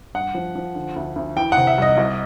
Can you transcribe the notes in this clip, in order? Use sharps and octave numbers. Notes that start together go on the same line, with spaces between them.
G2 F#5
F3
F3
D3
D2
D2
E3 G5
C3 F#5
E5
C2 D#5
C2